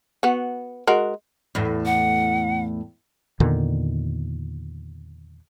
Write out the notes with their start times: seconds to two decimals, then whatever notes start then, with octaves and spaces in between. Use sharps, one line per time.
0.23 B3 F#4
0.87 G#3 F#4 A#4
1.55 E2 A2
1.86 F#5
3.40 E2 A#2 D3 D#3